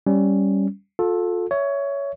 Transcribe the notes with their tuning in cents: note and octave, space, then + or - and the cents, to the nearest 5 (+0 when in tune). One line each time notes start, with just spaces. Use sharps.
G3 +0 C#4 +0
F4 +35 A4 -5
C#5 +15 E5 +0